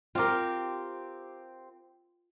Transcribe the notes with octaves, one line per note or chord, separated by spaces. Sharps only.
C4 F4 G4 A#4